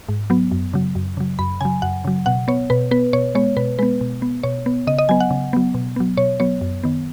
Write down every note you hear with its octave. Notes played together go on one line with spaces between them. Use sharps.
G#2
F#3 B3
F#2
C#3 F#3
F#2
C#3 F#3
F#2 B5
C#3 F#3 G#5
F#2 F#5
C#3 F#3
B2 F#5
B3 C#5
B2 B4
B3 B4
B2 C#5
G#3 B3 C#5
B2 B4
G#3 B3 B4
B2
B3
B2 C#5
B3
C#3 D#5
D#5
F#3 B3 G#5
F#5
C#3
F#3 B3
B2
F#3 B3
B2 C#5
F#3 B3 C#5
F#2
D#3 B3